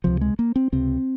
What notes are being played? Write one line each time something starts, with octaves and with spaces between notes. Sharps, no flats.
C#2 C3 F3
G#3
A#3
C4
C#2 C3 C4